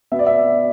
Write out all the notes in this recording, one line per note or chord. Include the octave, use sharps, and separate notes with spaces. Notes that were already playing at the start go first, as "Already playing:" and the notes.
B2 B3 E5
D5
E5